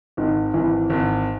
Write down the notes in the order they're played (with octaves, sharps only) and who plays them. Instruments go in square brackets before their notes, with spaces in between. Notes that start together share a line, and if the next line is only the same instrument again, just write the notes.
[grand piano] G#1 [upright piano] D#3
[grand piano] G#1 [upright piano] E3
[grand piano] G#1